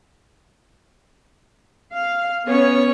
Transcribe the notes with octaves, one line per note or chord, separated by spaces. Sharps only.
F5
B3 C#4 C#5